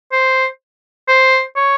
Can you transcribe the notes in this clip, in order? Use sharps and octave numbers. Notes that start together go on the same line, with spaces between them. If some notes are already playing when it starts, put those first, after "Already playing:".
C5
C5
C#5